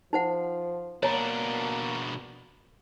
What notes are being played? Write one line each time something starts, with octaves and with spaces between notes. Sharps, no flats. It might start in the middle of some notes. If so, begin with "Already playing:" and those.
F3 D#4 C5 F#5
B2 A#3 D4 C#5 A#5